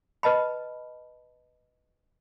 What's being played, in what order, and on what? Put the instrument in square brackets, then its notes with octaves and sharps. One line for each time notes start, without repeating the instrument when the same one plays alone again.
[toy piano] B4 D#5 A5 B5